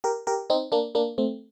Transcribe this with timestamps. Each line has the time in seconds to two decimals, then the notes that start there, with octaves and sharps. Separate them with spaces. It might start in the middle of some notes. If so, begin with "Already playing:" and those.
0.04 G4 A#4
0.27 G4 A#4
0.50 C4 D#4
0.72 A#3 D4
0.95 A#3 D4
1.18 A3 C4